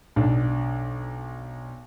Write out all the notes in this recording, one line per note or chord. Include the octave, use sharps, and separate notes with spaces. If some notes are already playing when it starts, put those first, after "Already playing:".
B1 D4